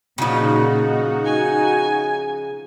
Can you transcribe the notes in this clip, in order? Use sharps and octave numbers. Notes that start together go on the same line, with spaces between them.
A#2 C#3 F3 D#4 F#4
G#5